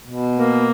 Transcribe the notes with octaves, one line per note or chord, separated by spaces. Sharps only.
B2
A#3